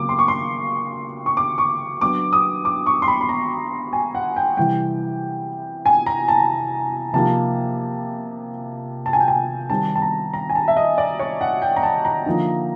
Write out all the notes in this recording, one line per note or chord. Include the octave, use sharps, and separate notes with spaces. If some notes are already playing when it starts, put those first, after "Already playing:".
Already playing: C#3 F#3 A#3 C#4 D6
C6
C#6
C6
C#6
D6
C#6
F#3 B3 D4 D6
D#6
D6
C#6
C6
B5
B5
A#5
G#5
F#5
G5
C3 E3 G3 G5
G#5
A#5
A5
C3 F3 A#3 D#4 A5
A5
G#5
G5
G#5
D#3 G3 C4 A5
A5
A#5
A#5
G#5
A5
E5
D#5
D5
C#5
F#5
G5
A#5
A5
A#5
D3 F3 A#3 D#4